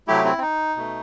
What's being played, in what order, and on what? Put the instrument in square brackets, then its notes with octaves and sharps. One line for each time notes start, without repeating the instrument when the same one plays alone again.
[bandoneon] C3 F#3 A3 E4 G4
C4 E4
C4
D#4
B2 A3